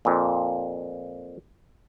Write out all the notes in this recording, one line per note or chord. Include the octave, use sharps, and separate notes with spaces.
F2 A#2